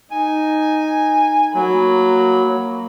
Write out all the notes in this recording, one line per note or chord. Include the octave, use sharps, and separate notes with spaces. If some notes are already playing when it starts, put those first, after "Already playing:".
D#4 G#5
F#3 A#3 B5